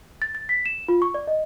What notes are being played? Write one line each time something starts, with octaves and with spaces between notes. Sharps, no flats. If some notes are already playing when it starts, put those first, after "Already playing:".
A6
A6
B6
E7
F4
C#6
D5
D#5